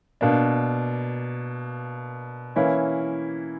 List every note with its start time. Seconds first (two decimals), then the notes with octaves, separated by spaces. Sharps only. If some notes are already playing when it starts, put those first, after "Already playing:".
0.21 B2 A#3 D4
2.56 E3 A#3 C#4 E4